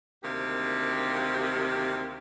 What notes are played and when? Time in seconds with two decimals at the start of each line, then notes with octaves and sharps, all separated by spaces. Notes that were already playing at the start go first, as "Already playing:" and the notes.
0.24 D2 C3 D#3 A#3 G4